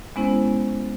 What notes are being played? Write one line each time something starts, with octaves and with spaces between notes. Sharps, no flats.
G#3 B3 C#4 E4 C5